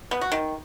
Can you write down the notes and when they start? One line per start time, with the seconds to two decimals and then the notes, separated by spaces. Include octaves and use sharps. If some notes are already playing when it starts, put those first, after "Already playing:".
0.11 B3
0.21 F#4
0.32 D#3